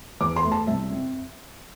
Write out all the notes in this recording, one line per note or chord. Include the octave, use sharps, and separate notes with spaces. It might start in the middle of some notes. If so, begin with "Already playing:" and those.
E2 D6
C6
A3
A5
C2 E5
C4